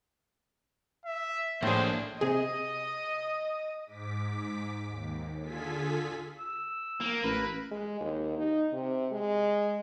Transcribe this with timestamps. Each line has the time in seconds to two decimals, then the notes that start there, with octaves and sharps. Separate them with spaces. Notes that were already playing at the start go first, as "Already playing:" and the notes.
1.05 E5
1.63 A2 A#3 D4 G#4 C5
2.21 C3 G#4 D#5
3.86 G#2 D6 B6
4.87 D#2
5.41 D3 F4 G#4 A4 G#5 B6
6.39 E6
7.01 A#3
7.24 A1 A#4 B4
7.71 G#3
8.01 D#2
8.38 D#4
8.73 C3
9.12 G#3